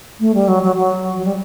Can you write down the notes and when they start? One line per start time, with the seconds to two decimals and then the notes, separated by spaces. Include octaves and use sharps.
0.20 A3
0.34 G3
0.48 F#3
0.63 F#3
0.76 F#3
1.18 F#3
1.25 G3